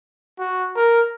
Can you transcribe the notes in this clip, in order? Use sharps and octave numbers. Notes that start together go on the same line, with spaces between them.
F#4
A#4